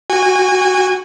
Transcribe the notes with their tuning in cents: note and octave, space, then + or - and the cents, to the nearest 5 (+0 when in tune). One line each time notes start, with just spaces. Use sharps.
F#4 +0 G#5 -30